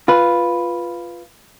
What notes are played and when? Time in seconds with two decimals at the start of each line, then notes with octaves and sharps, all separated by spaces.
0.08 F4 B4